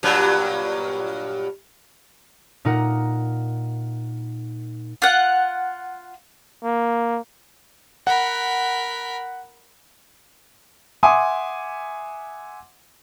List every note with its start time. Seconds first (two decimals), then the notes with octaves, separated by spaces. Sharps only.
0.03 G2 A#2 F#3
2.65 A#2 D#4 A#4 F#5
5.02 F4 F#5
6.64 A#3
8.07 A#4 F#5 B5
11.03 E5 F#5 G#5 C6 D6 D#6